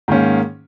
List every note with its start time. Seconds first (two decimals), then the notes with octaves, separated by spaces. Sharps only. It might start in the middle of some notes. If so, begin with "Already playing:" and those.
0.08 G#2 D#3 A#3 C#4